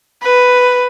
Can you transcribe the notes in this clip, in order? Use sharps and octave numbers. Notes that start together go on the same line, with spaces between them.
B4